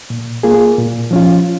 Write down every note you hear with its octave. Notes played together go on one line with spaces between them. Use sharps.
A#2
A#3 F4 G#4
A#2
F3 C#4 F4